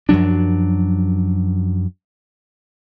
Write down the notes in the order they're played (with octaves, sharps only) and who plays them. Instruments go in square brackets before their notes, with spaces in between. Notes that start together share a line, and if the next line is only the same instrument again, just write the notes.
[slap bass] F#2 F3 F#3 D4